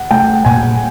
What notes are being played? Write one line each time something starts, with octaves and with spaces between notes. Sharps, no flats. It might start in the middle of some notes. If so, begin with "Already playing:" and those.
Already playing: F#5
A3 G5
A#2 G#5